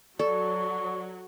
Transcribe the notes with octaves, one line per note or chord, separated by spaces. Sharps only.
F#3 A4 D5 C#6